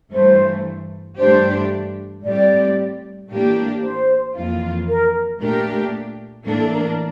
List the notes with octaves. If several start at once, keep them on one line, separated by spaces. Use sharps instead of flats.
G2 E3 A3 C5
G2 E3 A3 D4 G4 C5
A2 G3 C4 G4 D5
A2 E3 A#3 D4 G4
C5
F2 E3 A#3 F4
A#4
A#2 A3 D4 G4 A#4
A2 E3 A#3 D4 A4
A4
A#4
A#4